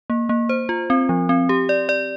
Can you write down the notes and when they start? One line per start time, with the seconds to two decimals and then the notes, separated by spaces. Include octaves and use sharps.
0.10 A#3
0.29 A#3
0.49 C5
0.69 F4
0.90 C4
1.09 F3
1.29 C4
1.49 G4
1.69 D5
1.89 D5